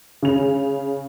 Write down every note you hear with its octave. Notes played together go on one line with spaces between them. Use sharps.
C#3 F7